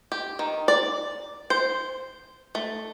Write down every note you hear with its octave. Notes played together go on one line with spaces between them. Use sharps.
G4
D#3
D5
C5
A3